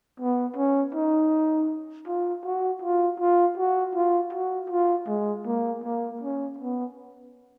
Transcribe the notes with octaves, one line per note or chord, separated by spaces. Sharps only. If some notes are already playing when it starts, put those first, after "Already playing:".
B3
C#4
D#4
F4
F#4
F4
F4
F#4
F4
F#4
F4
G#3
A#3
A#3
C#4
B3